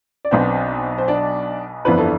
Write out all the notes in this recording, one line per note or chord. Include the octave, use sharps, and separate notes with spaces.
D5
B1 B2 B3 C4 D4 C5
C5
D4 D5
G1 F2 E3 B3 D4 B4
A4